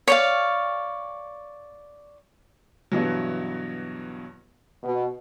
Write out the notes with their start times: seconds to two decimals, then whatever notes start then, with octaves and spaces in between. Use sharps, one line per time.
0.07 C#5 D5 F5
2.92 G2 B2 E3 F#3
4.83 B2